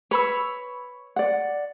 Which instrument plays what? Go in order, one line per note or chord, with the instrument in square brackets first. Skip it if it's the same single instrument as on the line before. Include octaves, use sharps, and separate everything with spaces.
[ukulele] B4 [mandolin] C#5 B5 E6
[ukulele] D5 F#5